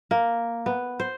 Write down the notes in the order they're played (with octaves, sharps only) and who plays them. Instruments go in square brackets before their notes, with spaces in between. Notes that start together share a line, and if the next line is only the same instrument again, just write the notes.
[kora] A#3
B3
C5